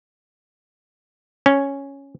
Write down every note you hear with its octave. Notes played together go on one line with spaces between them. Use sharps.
C#4